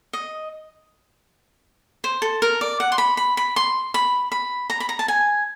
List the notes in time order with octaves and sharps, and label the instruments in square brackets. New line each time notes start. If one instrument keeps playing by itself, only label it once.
[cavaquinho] D#5
C5
A4
A#4
D5
F#5
C6
B5
B5
B5
C6
B5
B5
A#5
B5
A#5
A5
G#5